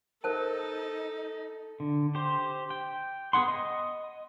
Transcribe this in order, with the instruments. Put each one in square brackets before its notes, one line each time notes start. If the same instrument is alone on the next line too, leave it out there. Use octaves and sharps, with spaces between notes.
[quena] D#4 [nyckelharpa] A4 [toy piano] A#4 C5 A5
[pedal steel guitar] D3
G4 C5
G5
B3 G#4 F#5 C6
D#5